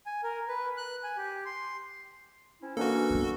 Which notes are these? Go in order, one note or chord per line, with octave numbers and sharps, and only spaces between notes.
G#5
A#4
B4
F#6
G#5
G4
C6
C4 C#4 E4
E3 A#3 C#4 D4 F#4 A4 F#5
B3 C4